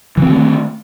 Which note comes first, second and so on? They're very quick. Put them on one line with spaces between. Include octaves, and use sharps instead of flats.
E3 C4 D#3 A3